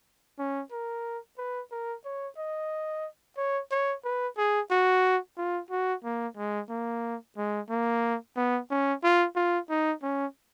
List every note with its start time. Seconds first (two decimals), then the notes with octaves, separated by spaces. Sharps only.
0.39 C#4
0.72 A#4
1.38 B4
1.72 A#4
2.05 C#5
2.37 D#5
3.37 C#5
3.71 C#5
4.05 B4
4.37 G#4
4.71 F#4
5.37 F4
5.71 F#4
6.04 A#3
6.37 G#3
6.70 A#3
7.37 G#3
7.70 A#3
8.37 B3
8.70 C#4
9.03 F4
9.36 F4
9.70 D#4
10.03 C#4